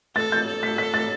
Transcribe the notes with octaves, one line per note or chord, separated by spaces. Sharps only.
A4 A6
G6
A4
B6
B6
A6